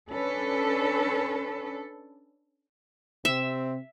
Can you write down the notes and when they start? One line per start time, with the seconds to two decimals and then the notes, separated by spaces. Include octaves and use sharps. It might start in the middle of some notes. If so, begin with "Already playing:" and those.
0.11 C#4 D4 A4 B4
3.25 C3 C4 E5